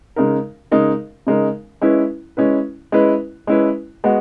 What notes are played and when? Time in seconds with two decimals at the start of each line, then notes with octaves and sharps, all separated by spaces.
0.16 C#3 G#3 D#4 A#4
0.71 C#3 G#3 D#4 A#4
1.27 C#3 G#3 D#4 A#4
1.81 G#3 C#4 E4 B4
2.37 G#3 C#4 E4 B4
2.92 G#3 C#4 E4 B4
3.47 G#3 C#4 E4 B4
4.04 G#3 B3 F#4